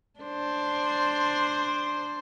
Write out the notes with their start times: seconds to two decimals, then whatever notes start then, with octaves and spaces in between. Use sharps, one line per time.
0.20 D4 C5